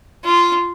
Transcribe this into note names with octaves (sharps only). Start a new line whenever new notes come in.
F4